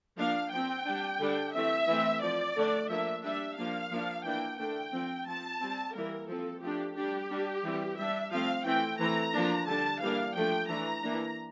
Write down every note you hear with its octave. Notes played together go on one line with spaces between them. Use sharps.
F3 A#3 D4 F5
F3 C4 G5
G3 D4
D3 G3 D4
E3 A3 C4 E5
E3 A3 C4
F3 C4 D5
D3 A3 D4
F3 A#3 D4 E5
G3 D4 E5
F3 A#3 D4 F5
F3 A#3 D4
E3 A#3 D4 G5
D3 A3 D4 G5
F3 C4
F3 C4 A5
G3 C4
E3 G3 A#3 A#4
F3 C4 A4
F3 A3 D4 G4
D4 G4
G3
G3 D4
E3 G3 C4
G3 D4 E5
F3 A3 C4 F5
E3 A3 C4 G5
E3 A3 C4 A#5
F3 A#3 D4
D3 G3 D4 A5
E3 G3 A#3 D4 F5
F3 A3 D4 G5
E3 A3 D4 A#5
E3 A#3 D4